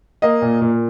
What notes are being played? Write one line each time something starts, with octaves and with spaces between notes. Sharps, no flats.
A#3 D#5
A#2
A#2